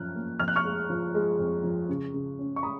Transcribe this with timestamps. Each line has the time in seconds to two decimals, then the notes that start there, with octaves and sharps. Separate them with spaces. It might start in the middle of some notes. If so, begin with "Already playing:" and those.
Already playing: F#2 F3 C#4 F6 F#6
0.15 A#3
0.40 F2 F6
0.48 F#6
0.56 C#6 F6
0.65 G#3
0.90 F3
1.14 G#3
1.39 F2
1.64 F3
1.89 C#3
2.14 C#3
2.39 C#4
2.56 C#6
2.63 G#3 B5 D#6